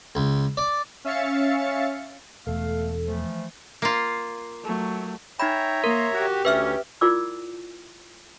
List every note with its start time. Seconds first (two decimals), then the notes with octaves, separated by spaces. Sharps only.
0.15 C#2
0.57 D5
1.04 C#4 E5 F5 A6 C#7
2.47 E1 E2 A3 A4 F5
3.06 E3 F3 A3
3.82 A#3 F4
4.63 F#3 A3
5.40 D#4 C#5 E5 G5 A#5 B5
5.84 A#3 A#4 C6
6.15 F#4 G4
6.45 D2 C#4 B4 E5 F6
7.01 E4 F4 A#4 D5 D6 E6